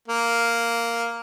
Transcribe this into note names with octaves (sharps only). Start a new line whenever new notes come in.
A#3